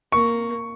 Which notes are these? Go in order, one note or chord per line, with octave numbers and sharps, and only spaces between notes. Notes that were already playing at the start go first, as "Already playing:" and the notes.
A#3 C#6